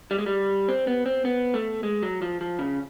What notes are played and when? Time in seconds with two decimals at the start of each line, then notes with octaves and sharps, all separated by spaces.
0.11 G3
0.18 G#3
0.26 G3
0.68 C4
0.87 B3
1.06 C4
1.25 B3
1.54 A3
1.83 G#3
2.03 F#3
2.22 F3
2.41 F3
2.59 C#3